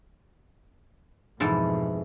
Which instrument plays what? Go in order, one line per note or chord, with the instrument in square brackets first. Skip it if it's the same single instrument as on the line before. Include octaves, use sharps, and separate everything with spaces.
[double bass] F2 B2 [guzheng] G#2 E3 A4